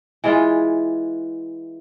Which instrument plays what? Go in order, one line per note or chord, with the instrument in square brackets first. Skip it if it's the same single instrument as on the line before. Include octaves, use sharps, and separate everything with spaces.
[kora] E3 G#3 F4